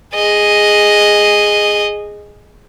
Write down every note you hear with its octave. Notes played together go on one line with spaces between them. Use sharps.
G#4 D#5